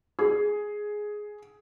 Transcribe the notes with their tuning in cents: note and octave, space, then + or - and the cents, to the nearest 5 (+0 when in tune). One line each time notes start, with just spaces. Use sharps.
G#4 +5